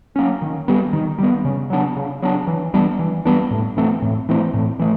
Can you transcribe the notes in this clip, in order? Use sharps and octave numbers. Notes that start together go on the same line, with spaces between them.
F#3 A#3 C#4
D#3
G3 B3
D#3
G3 B3
C#3
F#3 B3 D4
C#3
F#3 B3 D4
E3
G3 B3 D4
E3
G3 B3 D4
A2
E3 A3 C4
A2
E3 A3 C4
A2
E3 A3